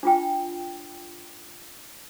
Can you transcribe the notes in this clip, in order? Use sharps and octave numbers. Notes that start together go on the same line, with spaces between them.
D4 F4 G5